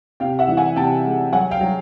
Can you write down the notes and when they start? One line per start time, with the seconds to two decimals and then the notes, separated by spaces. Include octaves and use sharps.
0.20 C3 F5 G5
0.39 E5 F#5
0.48 E3
0.57 F#5 G#5
0.76 C3 G5 A5
1.05 G#3
1.32 F#3 F#5 G#5
1.51 F5 G5
1.61 F#3